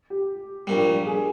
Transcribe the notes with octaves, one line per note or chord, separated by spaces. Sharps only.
G4
A#1 A#2 G3
G#4